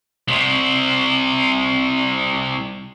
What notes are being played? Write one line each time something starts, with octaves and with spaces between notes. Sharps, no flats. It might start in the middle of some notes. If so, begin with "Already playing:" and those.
C2 C3